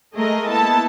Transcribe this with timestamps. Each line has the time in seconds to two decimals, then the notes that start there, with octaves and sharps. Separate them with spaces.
0.15 G#3 A3 G#4 A#4 D#5
0.49 A#3 B3 E4 A4 A5